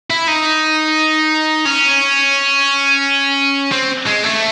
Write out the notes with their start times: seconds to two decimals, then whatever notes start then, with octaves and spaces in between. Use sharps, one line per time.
0.10 E4
0.28 D#4
1.65 C#4
3.72 C4
4.06 G#3
4.23 A3